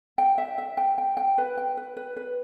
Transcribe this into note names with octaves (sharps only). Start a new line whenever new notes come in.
G5
E5
E5
G5
G5
G5
B4
G5
B4
B4
B4